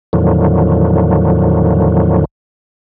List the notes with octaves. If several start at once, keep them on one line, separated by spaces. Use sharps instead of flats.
E2 A2 D3 D#3 F3 F#3